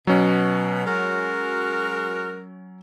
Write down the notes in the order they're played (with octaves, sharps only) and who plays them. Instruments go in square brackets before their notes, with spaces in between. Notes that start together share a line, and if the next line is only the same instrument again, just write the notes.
[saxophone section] B2 [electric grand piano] F#3 C#4
[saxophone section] G#3 F#4 A#4